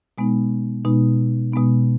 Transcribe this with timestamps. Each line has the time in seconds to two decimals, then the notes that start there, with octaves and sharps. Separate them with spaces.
0.18 B2 G#3 B3 D#4
0.85 B2 G#3 B3 D#4
1.52 B2 G#3 B3 D#4